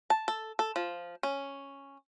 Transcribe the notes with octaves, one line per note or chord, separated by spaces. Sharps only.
A5
A4
A4
F3
C#4